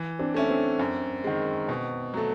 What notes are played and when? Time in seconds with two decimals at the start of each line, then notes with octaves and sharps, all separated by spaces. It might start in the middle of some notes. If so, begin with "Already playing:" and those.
Already playing: E3
0.19 C4 D4
0.34 A3 C#4 E4
0.49 C4 D4
0.79 F#2
1.24 D#3 G#3
1.69 B2
2.14 F#3 A3